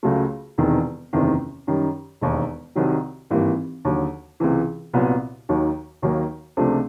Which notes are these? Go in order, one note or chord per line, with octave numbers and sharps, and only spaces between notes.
C#2 C#3 F#3 A3
E1 E2 C3 D#3
F#1 E2 C3 D#3
F#2 D#3 G3
E1 D#2 D#3
C2 C3 D#3 F#3
G#1 G2 E3 G3 A#3
D#2 D3 F#3
C#2 C3 E3
C2 A#2 F#3 B3
D#2 D#3 F#3
D#2 D#3 F#3 A#3 D#4
C#2 C3 F3 A3 D4